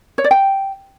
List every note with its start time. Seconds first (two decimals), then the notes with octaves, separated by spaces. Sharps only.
0.18 C#5
0.24 D5
0.31 G5